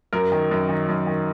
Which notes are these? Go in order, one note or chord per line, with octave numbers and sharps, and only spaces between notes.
F#2 A#4
D#3
F#2
D#3
F#2
D#3